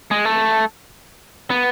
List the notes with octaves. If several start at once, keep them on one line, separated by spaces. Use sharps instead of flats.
G#3
A3
B3